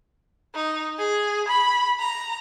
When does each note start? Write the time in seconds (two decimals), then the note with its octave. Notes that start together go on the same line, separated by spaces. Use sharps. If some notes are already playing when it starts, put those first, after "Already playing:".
0.55 D#4
0.99 G#4
1.48 B5
2.00 A#5